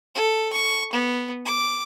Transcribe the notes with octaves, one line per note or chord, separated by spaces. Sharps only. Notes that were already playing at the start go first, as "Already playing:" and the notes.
A4
C#6
B3
D6